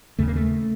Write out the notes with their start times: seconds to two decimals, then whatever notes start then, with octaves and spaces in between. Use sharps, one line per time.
0.19 D#2 C#3 A3
0.28 A#3
0.36 A3